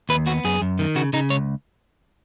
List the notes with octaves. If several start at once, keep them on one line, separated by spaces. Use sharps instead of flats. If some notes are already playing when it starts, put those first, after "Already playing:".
D#2 B4
B3 F#4
F#2 G#4
F#2
D#3
C#3 F#4
C#3 D#4
C#2 C#5